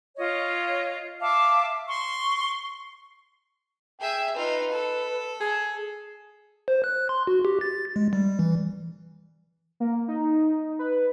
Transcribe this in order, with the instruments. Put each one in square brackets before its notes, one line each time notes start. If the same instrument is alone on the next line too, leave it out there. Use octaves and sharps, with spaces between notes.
[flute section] F4 C#5 D#5
E5 F5 A5 D6
C6 C#6
[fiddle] G#4 E5 [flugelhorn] G5
[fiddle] D#4 F4 [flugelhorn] B4
[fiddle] A4
[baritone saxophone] G#4
[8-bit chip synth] C5
F#6
C6
F#4
G4
A6
G#3
G3
E3
[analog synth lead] A#3
D#4
B4